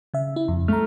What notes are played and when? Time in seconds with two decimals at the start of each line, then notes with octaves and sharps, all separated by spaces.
0.14 C#3 E5
0.36 E4
0.48 F2
0.68 A3 A#5 F6